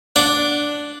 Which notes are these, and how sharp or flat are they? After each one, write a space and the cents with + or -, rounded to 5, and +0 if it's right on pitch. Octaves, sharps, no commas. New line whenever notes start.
D4 -5 F#5 +0